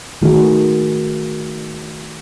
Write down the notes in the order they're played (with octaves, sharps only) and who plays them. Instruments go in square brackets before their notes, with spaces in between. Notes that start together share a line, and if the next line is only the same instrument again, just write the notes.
[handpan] D#3 A3 F#4 G#4